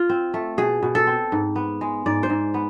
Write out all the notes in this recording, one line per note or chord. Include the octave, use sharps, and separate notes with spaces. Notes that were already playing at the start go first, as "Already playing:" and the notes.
Already playing: F4
C4
A3
B2 G#4
B2
A4
C4
G#2
B3
G#3
G#2 D5
C5
G#2
B3